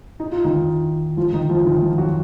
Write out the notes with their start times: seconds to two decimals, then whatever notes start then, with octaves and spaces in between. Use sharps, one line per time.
0.20 D#4
0.32 F4
0.44 D#3 D#4
1.17 F3 F4
1.33 D#3 D#4
1.49 F3 F4
1.65 D#3 D#4
1.82 F3 F4
1.98 F#3 F#4